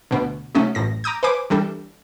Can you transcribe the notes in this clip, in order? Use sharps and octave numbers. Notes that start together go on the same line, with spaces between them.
D2 B2 D3
C3 F#3 A3 C#4 D#4
A1 F#2 A2 A#6
A#5 D6 D#6 G6
B4 C5 G#5 D6
E3 G3 D4 A4